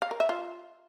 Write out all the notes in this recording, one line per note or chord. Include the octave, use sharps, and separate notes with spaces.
F5
A#4
E5
F4